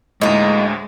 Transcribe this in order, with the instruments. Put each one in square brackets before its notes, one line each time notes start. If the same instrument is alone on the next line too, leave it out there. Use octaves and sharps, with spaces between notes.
[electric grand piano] D2 A2 [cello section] G#3 [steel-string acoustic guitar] A#3 D#4